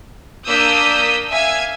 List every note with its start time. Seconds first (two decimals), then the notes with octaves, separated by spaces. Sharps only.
0.48 A#3 D4 D#6 E6 G6 B6
1.31 E5 F5 G#5 G#6